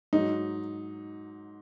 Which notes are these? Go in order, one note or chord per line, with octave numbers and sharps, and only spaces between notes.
G#2 F#3 D#4